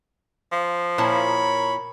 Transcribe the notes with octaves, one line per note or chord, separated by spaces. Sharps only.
F3
A#2 E4 A#4 C#5 A5 B5